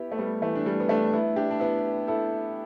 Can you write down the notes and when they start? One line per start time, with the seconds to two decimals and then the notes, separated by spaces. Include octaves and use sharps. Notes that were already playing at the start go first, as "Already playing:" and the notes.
Already playing: B3 E4 G4
0.12 A3
0.18 G3 B3
0.42 E3 A3
0.55 D4
0.65 G3 B3
0.80 B3
0.89 A3 D4
1.13 B3 E4
1.36 D4 G4
1.51 D4
1.60 B3 E4
2.08 E4 A4